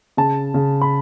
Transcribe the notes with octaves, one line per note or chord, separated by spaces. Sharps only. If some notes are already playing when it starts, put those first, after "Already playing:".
C#3 A5
C#3
B5